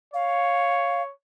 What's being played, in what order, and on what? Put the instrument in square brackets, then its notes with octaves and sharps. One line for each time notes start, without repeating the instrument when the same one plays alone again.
[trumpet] C#5 [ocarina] F5